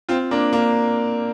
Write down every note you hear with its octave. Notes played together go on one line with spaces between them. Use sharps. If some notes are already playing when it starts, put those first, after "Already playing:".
C4 F4
A#3 D4
A#3 D4